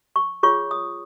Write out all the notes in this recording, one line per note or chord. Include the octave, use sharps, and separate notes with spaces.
C#6
F4 G#4 C#5 C#6
D#6